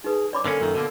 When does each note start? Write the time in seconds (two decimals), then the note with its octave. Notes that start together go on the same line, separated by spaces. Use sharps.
0.04 D#4 G#4 B4
0.33 C#5 D5 B5 D6
0.46 D3 A#3 C#4 A4
0.61 F#2 A#2 D#3
0.75 B2 D3 A#3